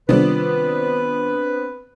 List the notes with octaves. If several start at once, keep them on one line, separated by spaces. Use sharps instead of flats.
C3 D#3 G3 B3 C4 D4 F4 B4